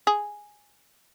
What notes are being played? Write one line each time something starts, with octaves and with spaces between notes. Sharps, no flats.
G#4